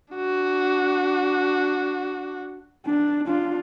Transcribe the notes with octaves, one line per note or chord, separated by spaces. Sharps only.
D4 F#4
D4
D4 F4